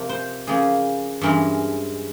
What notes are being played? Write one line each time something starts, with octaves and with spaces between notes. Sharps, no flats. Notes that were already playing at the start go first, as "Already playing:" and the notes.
Already playing: C3 F3 A#3
C5
C#3 F3 A#3 C#4 G#4
G2 E3 G#3 C#4 A#4